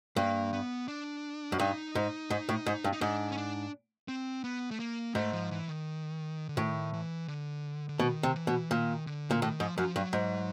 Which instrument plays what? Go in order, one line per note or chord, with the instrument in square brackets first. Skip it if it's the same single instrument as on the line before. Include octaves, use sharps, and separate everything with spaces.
[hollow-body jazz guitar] G2 [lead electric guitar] A#3
[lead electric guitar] B3
D4
[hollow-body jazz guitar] F#2
[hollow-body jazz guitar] G2 [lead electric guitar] D#4
[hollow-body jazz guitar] G#2
G#2
A2
G#2
G2
[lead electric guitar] D#4
[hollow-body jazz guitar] G#2 [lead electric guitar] D4
[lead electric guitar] C#4
D4
C4
B3
A3
A#3
[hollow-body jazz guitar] G#2 [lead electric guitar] A3
[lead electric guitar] F3
E3
D#3
D3
[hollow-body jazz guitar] A2 [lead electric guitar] D#3
[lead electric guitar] E3
D3
D3
[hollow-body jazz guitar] B2 [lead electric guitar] D#3
[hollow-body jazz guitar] C3
[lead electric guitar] E3
[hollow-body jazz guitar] B2
[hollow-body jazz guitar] A#2 [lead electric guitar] D#3
[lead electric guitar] D3
[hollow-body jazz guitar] A#2
[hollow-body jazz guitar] A2 [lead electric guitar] D#3
[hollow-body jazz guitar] G#2 [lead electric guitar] F3
[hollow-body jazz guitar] F#2 [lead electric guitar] F3
[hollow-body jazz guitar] G2 [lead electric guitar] F#3
[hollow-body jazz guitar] G#2